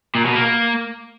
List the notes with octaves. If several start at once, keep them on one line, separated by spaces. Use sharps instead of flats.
A#2
B2
A#3